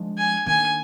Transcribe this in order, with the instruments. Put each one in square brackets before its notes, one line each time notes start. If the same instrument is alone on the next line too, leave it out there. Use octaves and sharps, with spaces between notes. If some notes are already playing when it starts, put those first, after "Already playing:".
Already playing: [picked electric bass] F3 G#3 D4
[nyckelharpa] G#5
[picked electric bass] D#3 A#3 D4 [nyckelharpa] G#5